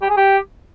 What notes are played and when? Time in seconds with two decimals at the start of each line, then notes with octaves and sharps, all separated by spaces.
0.02 G4
0.09 G#4
0.17 G4